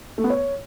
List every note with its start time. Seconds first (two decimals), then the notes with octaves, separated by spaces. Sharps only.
0.18 A3
0.24 B3
0.30 C#5